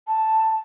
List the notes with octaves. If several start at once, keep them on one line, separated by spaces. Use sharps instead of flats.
A5